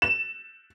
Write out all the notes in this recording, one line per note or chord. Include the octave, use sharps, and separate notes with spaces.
E7